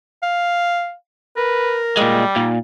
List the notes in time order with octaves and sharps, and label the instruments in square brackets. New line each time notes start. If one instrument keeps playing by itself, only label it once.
[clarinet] F5
[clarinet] A#4 [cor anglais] B4
[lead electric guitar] A#2 G#3 [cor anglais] G3
[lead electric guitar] A#2 [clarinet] D#4